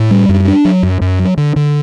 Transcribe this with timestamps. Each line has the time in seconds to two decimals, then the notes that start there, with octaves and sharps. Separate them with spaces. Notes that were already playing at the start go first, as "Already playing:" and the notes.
Already playing: A2
0.11 G3
0.29 F#2
0.48 D4
0.65 F#3
0.83 F#2
1.01 F#2
1.19 F#3
1.37 D3
1.56 D3